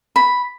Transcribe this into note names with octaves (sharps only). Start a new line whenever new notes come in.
B5